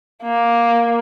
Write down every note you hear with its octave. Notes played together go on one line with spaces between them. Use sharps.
A#3